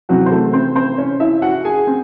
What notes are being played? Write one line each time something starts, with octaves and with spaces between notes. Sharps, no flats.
C3 E3 F#3 C4 F#4
C5
A3 A4
C4 C5
C4 C5
C#4 C#5
E4 E5
F#4 F#5
G#4 G#5
C4